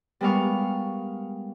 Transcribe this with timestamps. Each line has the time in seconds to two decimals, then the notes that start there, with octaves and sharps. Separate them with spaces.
0.21 G3 G#3 B3 A#4 F5 C#6